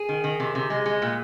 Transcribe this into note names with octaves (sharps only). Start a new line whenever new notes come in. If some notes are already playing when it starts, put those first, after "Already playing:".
Already playing: G#4
D#3
D#3
C3
C3
G#3
G#3
A#2